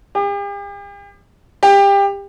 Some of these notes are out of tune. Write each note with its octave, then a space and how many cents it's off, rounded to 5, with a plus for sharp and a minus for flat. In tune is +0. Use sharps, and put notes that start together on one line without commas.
G4 +45
G4 +25